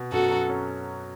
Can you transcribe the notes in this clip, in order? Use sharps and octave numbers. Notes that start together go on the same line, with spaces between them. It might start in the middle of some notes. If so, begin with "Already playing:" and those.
Already playing: B2
F#2 F#4 A4
F#3
C#4